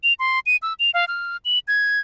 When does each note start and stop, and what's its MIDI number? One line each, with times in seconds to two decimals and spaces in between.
0.03 0.13 101
0.19 0.39 84
0.46 0.57 99
0.62 0.73 88
0.79 0.90 101
0.94 1.05 77
1.08 1.37 89
1.45 1.59 102
1.68 2.00 92